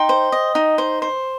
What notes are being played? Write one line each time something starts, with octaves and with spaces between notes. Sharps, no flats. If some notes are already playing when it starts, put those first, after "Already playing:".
Already playing: D#4 G5 C6
C5
D#5
D#4
C5
C5